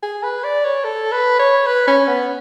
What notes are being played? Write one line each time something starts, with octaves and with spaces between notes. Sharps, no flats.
G#4
B4
D5
C#5
A4
B4
C#5
B4
C#4
B3